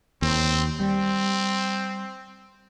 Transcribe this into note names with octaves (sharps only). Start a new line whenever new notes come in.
D#2 C4
G3 C4